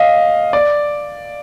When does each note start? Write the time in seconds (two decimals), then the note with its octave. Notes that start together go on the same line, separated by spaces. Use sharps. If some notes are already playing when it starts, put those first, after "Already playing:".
Already playing: D#5 F5
0.53 D5